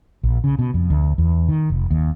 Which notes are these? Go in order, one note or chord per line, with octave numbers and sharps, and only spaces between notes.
A#1
C#3
B2
F2
D2
E2
D#3
F1
D#2